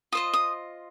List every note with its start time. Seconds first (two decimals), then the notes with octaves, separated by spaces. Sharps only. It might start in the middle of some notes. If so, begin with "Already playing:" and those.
0.12 F4 C5 D#5 D#6
0.33 D#6